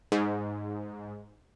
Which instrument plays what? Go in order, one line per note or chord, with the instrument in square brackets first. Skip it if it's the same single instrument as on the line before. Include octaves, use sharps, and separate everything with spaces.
[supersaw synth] G#2